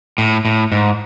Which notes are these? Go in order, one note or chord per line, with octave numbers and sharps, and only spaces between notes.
A2
A2
G#2